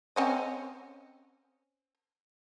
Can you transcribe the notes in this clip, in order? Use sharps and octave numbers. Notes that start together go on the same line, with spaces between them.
C4 C#4 D#5